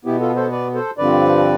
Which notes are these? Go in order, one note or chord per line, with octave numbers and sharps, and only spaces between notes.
B2 B3 E4 G4
F4 A4
A4 C5
B4 D5
A4 C5
G2 D3 F3 C4 B4 D5